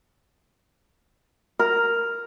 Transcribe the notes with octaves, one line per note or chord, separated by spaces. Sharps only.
A#4